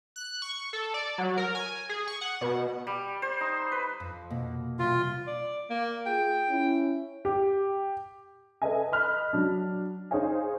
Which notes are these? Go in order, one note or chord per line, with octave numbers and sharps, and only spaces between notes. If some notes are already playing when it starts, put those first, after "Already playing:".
F#6
C#6
A4
D5
F#3
A#4
G#5
G#4
C#6
F#5
B2
G3
C5
D#4
B4
F2
B2 A#3
C3 G3 F4
D5
A#3
F4 G#4 G5
C#4 E4
G4
A4 B4 D#5 E5 G#5
D#5 B5 F6 F#6
F#3 D4
D#4 G#4 C5 C#5 F5 G#5